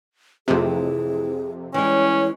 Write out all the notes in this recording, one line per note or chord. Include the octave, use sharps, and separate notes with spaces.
F2 C3 E3 A3 G#4
E3 G3 G#3 C#4 C#5